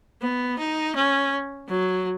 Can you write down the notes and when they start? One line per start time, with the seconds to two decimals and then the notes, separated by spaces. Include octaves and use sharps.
0.22 B3
0.58 D#4
0.96 C#4
1.68 F#3